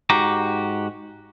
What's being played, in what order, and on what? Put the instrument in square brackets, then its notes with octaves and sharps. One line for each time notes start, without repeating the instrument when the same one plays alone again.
[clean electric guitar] G#2 F#4 G4 A#5